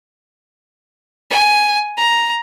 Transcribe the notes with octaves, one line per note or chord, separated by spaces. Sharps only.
G#5
A#5